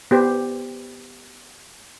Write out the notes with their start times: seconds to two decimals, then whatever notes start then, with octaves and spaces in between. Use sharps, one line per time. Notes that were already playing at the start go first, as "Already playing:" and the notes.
0.11 B3 G4 C5